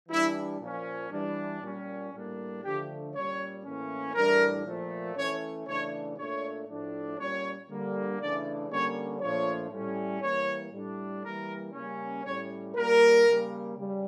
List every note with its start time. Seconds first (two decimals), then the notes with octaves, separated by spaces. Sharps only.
0.09 E3 G3 D4 E4
0.60 A#2 F3 C#4
1.10 E3 G3 D4
1.61 A#2 G3 C#4
2.12 A2 G3 A#3 D4
2.62 D3 F3 A3 D4 G4
3.13 A#2 G3 C#4 C#5
3.63 A2 E3 A#3 C#4
4.14 A2 E3 G3 D4 A#4
4.65 A#2 F3 A3
5.15 E3 A3 C#4 C#5
5.66 C#3 E3 A3 D4 C#5
6.17 A#2 A3 D4 C#5
6.67 A2 F3 A3 D4
7.17 A#2 G3 C#4 C#5
7.69 D3 G3 A#3
8.19 C#3 E3 A3 D4 D5
8.69 D3 G3 A#3 C#4 C#5
9.20 A#2 F3 A3 D4 C#5
9.71 A2 G3 C#4
10.21 E3 G3 A#3 C#5
10.72 A2 G3 D4
11.23 E3 G3 A#3 A#4
11.73 C#3 G3 A#3 C#4
12.23 A2 G3 C#4 C#5
12.75 A#2 G3 A#3 A#4
13.26 C#3 G3 A#3
13.75 C#3 G3